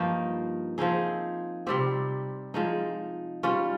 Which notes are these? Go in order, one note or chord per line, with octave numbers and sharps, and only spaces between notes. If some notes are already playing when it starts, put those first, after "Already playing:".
Already playing: G2 F3 A#3 D#4
F3 C4 D#4 G#4
C3 G3 C4 G4
F3 G#3 D#4
G3 C#4 F4